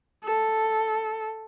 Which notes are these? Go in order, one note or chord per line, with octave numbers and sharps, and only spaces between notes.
A4